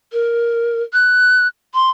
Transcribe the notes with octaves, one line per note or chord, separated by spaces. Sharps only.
A#4
F#6
C6